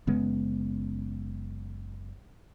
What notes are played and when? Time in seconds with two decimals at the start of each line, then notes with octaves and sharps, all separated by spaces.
0.07 F#1 C#3 G#3 B3